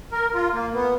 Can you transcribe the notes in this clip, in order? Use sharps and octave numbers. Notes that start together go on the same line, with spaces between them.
A#4
F4
A#3
B3